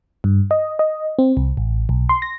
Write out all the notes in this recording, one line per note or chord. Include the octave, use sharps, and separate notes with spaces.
G2
D#5
D#5
C4
C2
A1
B1
C6
A#6